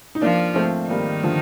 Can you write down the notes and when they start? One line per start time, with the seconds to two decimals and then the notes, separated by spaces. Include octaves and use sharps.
0.15 D#4
0.22 F3 A#3 D4 F4
0.55 A3 C4
0.89 D#3 G3 A#3 D#4
1.23 D3 F3